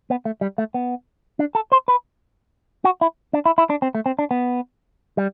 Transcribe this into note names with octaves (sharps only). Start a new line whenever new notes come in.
B3
A3
G3
A3
B3
D4
A4
C5
B4
F#4
E4
D4
E4
E4
D4
C4
A3
C4
D4
B3
G3